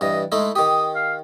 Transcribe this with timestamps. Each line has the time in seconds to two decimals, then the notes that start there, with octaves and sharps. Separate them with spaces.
0.01 G2 E3 D#5
0.32 G#3 A3 D#4 E4
0.56 D#3 G4 D#6
0.95 F5